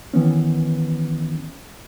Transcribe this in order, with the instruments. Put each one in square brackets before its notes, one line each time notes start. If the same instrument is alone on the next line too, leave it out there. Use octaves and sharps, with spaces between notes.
[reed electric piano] D#3 E3 B3 C#4